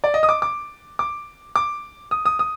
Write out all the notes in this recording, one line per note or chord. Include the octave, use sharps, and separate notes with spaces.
D5
D#5
D#6
D6
D6
D6
D6
D#6
D#6
D#6